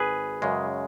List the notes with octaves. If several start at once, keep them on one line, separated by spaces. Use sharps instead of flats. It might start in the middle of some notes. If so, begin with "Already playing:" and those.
Already playing: G#1 G#4 B4
F#2 C#3 G#3